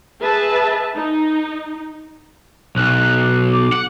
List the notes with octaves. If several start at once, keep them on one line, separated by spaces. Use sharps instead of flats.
G#4 B4 E5 A5
D#4
B1 F#6
D6
F#5